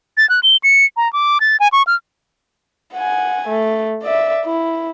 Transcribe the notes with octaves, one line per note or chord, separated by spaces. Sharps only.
A6
F#6
G7
C#7
A#5
D6
A6
G#5
C#6
F6
F#5 G#5
A3
D5 E5
E4